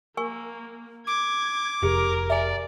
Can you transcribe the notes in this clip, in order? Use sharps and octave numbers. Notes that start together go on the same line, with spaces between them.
A#3 A#4 G#5 C#6
D6 G#6
F1 G4 G#4 A#4
D5 E5 G#5